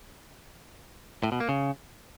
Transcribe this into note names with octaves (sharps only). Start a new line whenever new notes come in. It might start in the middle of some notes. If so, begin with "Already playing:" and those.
A2
B2
A#3
C#3